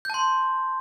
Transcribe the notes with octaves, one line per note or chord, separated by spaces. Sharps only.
A5 C6 G6